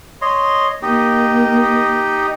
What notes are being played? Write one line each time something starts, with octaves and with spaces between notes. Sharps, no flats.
C#5 D#5 C6
A#3 D#4 G4 D#5